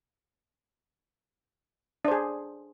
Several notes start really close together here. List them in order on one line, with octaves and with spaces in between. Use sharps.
D4 C5 G#4